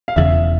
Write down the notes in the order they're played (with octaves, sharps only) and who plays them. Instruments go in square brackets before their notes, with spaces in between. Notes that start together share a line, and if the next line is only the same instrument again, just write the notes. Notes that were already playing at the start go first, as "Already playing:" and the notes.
[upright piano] F5
[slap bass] E1 E2 C#3 [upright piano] E5